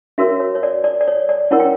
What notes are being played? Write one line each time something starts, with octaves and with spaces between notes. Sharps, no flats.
C#4 F#4 A#4 C#5 E5
C#5
C#5
D5
D5
D5
C#5
D5
C#4 E4 A#4 C#5 F#5
G5